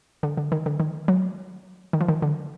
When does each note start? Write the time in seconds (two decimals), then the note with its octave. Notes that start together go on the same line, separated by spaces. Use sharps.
0.23 D3
0.37 D3
0.52 D#3
0.66 D3
0.80 D#3
1.08 F#3
1.93 D#3
2.01 F3
2.08 D#3
2.22 D3